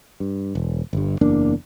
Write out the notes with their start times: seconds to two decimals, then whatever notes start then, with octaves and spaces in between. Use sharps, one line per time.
0.20 G2
0.55 E1
0.93 G1 G2
1.21 F#1 E2 A#3 D4